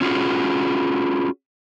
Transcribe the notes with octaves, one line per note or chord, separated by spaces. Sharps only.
C#4 F4 F#4 G#4